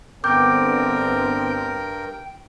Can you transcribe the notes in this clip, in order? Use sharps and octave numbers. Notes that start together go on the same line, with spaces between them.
G1 G2 B3 C4 A#4 G5 D6 G6